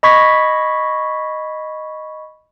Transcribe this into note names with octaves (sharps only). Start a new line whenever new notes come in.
D#5 B5 C#6 G#6 B6